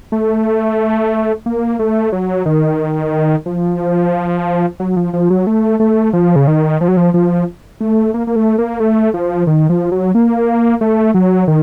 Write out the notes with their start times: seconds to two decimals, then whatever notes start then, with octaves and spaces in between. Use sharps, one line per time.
0.12 A3
1.46 A#3
1.79 A3
2.12 F#3
2.46 D#3
3.46 F3
4.80 F#3
4.97 F3
5.13 F3
5.30 F#3
5.47 A3
5.80 A3
6.13 F3
6.36 C#3
6.47 D#3
6.81 F3
6.88 F#3
6.97 F3
7.14 F3
7.81 A3
8.14 A#3
8.27 A#3
8.36 A3
8.58 A#3
8.80 A3
9.14 F3
9.47 D#3
9.69 F3
9.92 F#3
10.15 A#3
10.81 A3
11.14 F#3
11.48 D#3